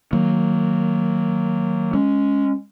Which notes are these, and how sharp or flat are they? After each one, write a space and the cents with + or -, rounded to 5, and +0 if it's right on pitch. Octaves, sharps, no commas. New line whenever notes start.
D#3 +0 F#3 +0 A#3 -15
G#3 +0 C#4 +0